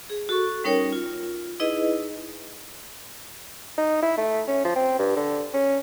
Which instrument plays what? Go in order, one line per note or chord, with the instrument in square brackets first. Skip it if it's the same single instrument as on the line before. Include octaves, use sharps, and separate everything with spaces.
[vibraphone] G#4
F#4 A4 C#6
G3 C#4 D#4 A#4 C#5 G5
F4
D#4 E4 G#4 B4 D#5
[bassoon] D#4
E4
A3
C#4
F3
C4
G2
D3
C#4